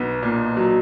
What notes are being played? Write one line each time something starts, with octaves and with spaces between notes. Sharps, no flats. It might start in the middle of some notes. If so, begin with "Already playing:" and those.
Already playing: B1 B3
A#2
F#3